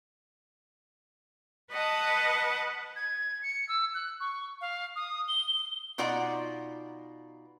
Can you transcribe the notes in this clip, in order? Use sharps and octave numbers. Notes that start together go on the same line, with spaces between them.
B4 D#5 F#5 A5
G#6
C#7
E6
F#6
C#6
F5
D#6
G7
B2 D#4 F4 D5 F#5 A#5